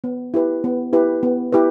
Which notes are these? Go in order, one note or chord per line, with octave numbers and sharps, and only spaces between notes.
B3
E4 G4 B4
B3
E4 G4 B4
B3
E4 G4 B4